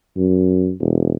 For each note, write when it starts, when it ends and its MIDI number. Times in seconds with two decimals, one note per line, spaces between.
0.17 0.71 42
0.80 1.15 28